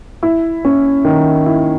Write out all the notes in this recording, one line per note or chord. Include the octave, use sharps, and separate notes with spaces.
E4
C#4
D#3
E4